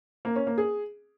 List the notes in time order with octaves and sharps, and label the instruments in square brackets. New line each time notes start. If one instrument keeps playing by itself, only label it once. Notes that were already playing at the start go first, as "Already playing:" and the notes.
[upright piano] A#3
C#4
A#3
G#4